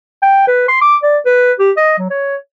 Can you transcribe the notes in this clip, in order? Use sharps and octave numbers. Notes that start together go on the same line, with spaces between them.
G5
B4
C6
D6
D5
B4
G4
D#5
F#3
C#5